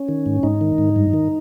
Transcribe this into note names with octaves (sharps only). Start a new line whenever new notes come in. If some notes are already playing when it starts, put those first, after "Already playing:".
Already playing: C#4
D#3
G#2
G#2 D#4
D#3
G#2
G2
D#3